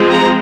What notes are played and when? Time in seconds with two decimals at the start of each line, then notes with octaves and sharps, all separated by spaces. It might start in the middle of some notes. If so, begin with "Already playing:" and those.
Already playing: F3 G#3 C4
0.09 A#5